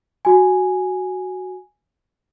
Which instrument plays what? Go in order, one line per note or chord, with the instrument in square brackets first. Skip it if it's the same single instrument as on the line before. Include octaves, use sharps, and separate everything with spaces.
[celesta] F#4 G#5